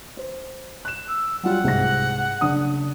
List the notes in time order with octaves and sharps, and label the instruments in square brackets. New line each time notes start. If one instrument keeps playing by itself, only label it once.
[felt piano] C5
F#6 E7
[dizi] E6
[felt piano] F#3 G3 F4 [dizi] F#5
[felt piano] C2 G#2 A#6
F#1 D4 D#6